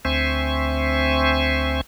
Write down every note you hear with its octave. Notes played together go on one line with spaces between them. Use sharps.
D2 C4 C5 E5 G#5 C#6